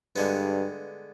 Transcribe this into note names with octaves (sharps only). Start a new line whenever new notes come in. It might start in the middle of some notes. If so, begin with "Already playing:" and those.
G2 D3 G#3 B3